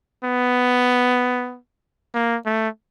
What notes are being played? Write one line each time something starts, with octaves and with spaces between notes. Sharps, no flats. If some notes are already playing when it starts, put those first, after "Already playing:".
B3
A#3
A3